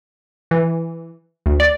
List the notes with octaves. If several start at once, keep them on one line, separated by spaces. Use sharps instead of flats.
E3
D2
D5